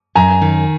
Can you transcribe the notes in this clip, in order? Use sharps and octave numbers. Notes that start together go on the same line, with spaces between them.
F#2 G#5 A#5
D#3